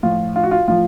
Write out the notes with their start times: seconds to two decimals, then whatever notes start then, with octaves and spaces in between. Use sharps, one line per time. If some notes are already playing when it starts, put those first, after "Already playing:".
0.03 A2 F3 F4
0.36 F4
0.43 F#4
0.51 F4
0.68 A2 F3 F4